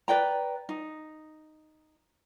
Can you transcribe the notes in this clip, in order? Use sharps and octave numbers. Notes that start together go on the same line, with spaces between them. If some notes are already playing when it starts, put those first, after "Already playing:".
B4 D5 G5 A#5
D#4